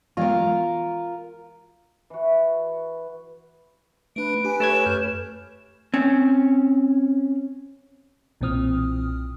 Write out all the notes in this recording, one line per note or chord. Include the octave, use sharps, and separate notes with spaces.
E3 G#3 B3 F4 A#4
E3 F#4
A3 D4 B4 D7
G4 G#5
A3 C#5 G#6 E7
F#2 F6 G6
C4 C#4
B1 A#2 E3 C4 D#6 F6